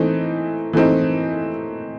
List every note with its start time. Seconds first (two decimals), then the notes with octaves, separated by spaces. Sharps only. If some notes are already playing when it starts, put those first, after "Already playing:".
Already playing: E3 A3 C4 D#4
0.73 E3 A3 C4 D#4